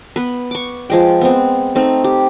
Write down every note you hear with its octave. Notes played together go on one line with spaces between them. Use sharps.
B3 B4
C#6 D6
F3 G#3 G5
B3 C4
A3 C4 D#4
G4